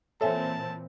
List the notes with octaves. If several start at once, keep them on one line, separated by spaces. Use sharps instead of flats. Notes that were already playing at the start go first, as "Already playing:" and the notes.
A#2 E3 C4 A4 C#5 E5 G#5 A5